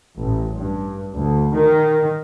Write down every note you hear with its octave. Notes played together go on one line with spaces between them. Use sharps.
A1
G2
D2
D#3